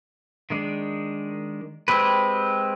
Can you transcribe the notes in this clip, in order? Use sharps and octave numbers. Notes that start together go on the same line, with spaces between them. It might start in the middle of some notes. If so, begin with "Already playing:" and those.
D#3 G#3 D4
G#3 C4 G4 B4